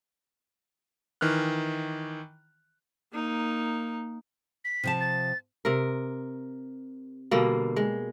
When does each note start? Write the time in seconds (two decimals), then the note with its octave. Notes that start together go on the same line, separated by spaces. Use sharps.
1.21 D#3 E3 F6 F#6
3.13 A#3 D#4
4.65 B6
4.84 C3 F3 A5
5.00 A6
5.65 C3 A#4
7.31 B2 D3 G3 A#3
7.76 G#3